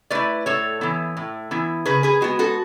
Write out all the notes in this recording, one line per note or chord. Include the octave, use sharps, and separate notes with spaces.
A3 E4 B4 D5
A2 A4 C#5
E3 B3 E4
A2
E3 B3 E4
C#3 G#4 B4
G#4 B4
G#3 B3 F#4
F#4 A4